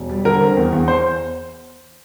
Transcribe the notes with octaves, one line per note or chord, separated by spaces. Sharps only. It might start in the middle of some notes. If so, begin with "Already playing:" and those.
Already playing: E1
G3
D3 A#4
C4
E2
E2
C5